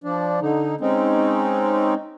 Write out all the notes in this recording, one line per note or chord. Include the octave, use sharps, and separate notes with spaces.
F3 D4
D3 D#4
G#3 C4 C#4 D#4